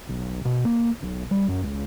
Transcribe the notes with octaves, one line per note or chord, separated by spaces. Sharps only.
B1
B2
A#3
B1
G3
F#2
C#2